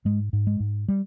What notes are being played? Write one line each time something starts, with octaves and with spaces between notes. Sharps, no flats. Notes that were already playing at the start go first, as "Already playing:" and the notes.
G#2 G#3
G#2
G#3
G#2
G3